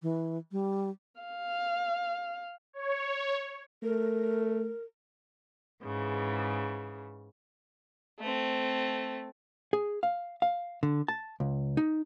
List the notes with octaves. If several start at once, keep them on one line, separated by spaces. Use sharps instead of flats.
E3
G3
F5
C#5
A3 A#4
G#2 C#3 E3
A3 C4
G#4
F5
F5
D3
A5
C#2
D#4